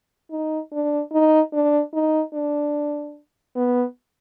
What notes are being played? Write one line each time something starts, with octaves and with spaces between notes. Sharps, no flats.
D#4
D4
D#4
D4
D#4
D4
B3